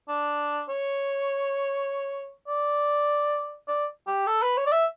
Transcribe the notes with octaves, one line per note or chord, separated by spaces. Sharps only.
D4
C#5
D5
D5
G4
A4
B4
C#5
D5
E5